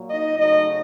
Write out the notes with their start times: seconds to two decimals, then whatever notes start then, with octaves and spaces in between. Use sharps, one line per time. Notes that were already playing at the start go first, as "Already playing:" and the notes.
Already playing: A#2 F#3 A#3
0.09 D#4 D#5
0.37 C#3 F#3 A3 D#4 D#5